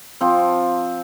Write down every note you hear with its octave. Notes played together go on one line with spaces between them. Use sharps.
F3 C4